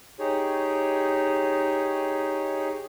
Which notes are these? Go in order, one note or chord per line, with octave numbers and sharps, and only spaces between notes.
D#4 G4 G#4 C#5